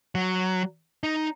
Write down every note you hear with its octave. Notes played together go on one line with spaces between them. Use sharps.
F#3
D#4